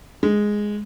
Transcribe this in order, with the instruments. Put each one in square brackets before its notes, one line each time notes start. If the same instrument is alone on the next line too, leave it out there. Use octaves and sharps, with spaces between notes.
[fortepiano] G#3